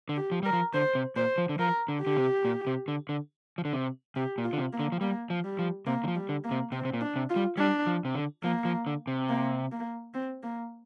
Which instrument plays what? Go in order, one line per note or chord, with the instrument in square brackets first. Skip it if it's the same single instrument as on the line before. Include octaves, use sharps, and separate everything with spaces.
[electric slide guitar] D3
[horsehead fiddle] G4
[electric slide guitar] F3
[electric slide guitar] G3 [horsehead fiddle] A#4
[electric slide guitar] F3
[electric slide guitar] D3 [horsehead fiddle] C5
[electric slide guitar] C3
[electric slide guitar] A#2 [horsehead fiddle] C5
[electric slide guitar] F3
D3
[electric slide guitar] F3 [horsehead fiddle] A#4
[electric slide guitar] D3
[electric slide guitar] D3 [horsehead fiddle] G4
[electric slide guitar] C3
A#2
C3
D3
D3
F3
D3
C3
[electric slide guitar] C3 [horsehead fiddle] G4
[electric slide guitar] A#2
[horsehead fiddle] F4
[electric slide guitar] D3
C3
[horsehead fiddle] A#3
[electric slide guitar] D3
F3
[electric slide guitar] G3 [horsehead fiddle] A#3
[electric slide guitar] F3
[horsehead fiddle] G3
[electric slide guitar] F3
[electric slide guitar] C3 [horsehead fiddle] A#3
[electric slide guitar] D3
F3
[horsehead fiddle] G3
[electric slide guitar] D3
[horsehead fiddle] A#3
[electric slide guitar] C3
[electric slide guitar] C3 [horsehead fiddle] C4
[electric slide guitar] C3
A#2
[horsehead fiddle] D4
[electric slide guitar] C3
[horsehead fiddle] F4
[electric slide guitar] G3
[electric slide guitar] G3 [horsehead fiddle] D4
[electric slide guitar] F3
C3
D3
[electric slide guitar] F3 [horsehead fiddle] A#3
[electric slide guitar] F3
D3
C3
[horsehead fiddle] A#3
A#3
C4
A#3